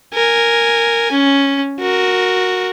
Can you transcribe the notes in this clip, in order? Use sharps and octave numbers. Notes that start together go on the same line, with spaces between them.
A#4 G#5
C#4
F#4 A#4